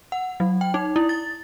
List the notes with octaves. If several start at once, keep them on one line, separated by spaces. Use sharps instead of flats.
F#5
F#3
G5
D#4
E4
A6